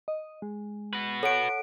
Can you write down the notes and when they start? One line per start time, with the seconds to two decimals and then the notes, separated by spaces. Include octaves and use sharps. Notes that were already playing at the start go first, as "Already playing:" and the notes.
0.08 D#5
0.42 G#3
0.93 F#4 B4
1.23 A4 C#5 F#5 D7